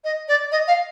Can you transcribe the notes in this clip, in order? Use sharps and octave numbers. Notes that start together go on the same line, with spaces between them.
D#5
D5
D#5
F5